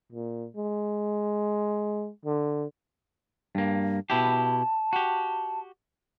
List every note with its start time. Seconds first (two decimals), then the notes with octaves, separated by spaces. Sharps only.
0.12 A#2
0.56 G#3
2.25 D3
3.55 G2 A#3
4.10 B2 E4 G4 A5
4.93 F#4 G4